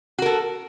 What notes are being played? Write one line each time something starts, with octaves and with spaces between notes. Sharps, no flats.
F#4 A4 A#4